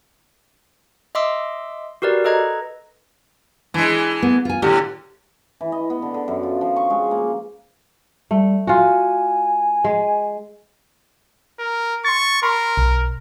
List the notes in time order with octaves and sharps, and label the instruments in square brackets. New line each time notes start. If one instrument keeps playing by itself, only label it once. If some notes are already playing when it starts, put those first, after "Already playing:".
[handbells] D#5 E5 C6 D6 E6
F#4 G4 A#4 B4 D5
A4 B4 D#5 A#5 G#6
[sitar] E3 G#3 [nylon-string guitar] D4
[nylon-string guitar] B3
F4 G#5
[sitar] A2 D3 [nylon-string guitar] G4
[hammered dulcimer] E3
D#5
B3
D3
D3
F#2
F4
F3
C#6
G#3
A#3
[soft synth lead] G3 [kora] A3
[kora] F4 F#4 [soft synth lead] G#5
[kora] G#3
[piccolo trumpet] A#4
[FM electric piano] C6 A6 [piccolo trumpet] C#6
[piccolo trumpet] A#4 [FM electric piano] B5 C6
[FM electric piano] B1